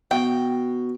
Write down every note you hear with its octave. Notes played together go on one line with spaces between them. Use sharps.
B2 G5